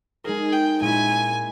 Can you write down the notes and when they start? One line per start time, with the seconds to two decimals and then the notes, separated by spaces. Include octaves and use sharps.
0.24 G#3 D#4 G#4 A#4
0.53 G5
0.81 A#2 G#3 C#4 E4 G#5